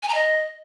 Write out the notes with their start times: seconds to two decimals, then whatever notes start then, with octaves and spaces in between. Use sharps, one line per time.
0.03 G#5
0.09 A#5
0.14 D#5